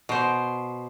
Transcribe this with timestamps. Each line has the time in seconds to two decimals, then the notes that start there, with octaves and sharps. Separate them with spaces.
0.09 B2 C5